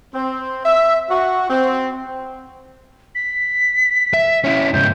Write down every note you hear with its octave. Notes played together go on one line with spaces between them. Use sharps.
C4
E5
F#4
C4
B6
E5
C#4 E4
G#2 C#3 G6